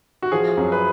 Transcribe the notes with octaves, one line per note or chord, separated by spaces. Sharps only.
F#4
F3 G#4
F#2
B4